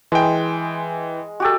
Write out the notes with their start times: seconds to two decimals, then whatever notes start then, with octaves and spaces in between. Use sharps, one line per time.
0.12 E3 G#3 G5
1.40 F#4 G4 A4